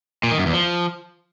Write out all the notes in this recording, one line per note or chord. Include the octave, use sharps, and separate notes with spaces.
A#2
D#3
F#2
E2
F3